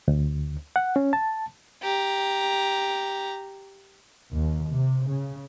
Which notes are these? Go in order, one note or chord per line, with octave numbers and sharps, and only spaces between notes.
D2
F#5
C#4
A5
G4 A#5
D#2
C3
C#3